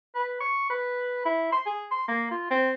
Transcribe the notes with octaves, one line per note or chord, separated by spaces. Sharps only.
B4
C#6
B4
E4
C6
G#4
C6
A#3
F4
C4